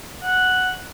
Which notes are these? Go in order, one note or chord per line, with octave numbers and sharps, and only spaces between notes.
F#5